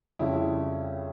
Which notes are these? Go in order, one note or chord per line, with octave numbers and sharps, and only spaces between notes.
F2 C#3 G3 E4